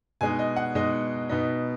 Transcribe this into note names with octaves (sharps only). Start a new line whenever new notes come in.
B2 G#3 D#4 G#5
D#5
F#5
B2 G#3 D#4 D#5
B2 B3 D#4